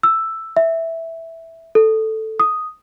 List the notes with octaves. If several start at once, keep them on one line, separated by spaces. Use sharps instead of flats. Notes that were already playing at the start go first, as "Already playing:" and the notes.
E6
E5
A4
D#6